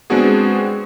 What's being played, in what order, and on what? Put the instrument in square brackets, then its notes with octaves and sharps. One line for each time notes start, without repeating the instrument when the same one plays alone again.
[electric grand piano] G#3 B3 C4 D4 F#4 G#4